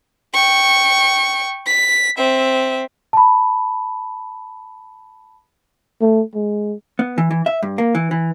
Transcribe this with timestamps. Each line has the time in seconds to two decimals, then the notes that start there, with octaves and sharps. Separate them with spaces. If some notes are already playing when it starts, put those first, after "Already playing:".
0.34 G5 C#6
1.67 B6
2.18 C4 E5
3.13 A5 B5
6.02 A3
6.35 G#3
6.99 B3
7.18 E3
7.31 E3
7.46 E5
7.63 G2
7.78 A#3
7.95 E3
8.11 E3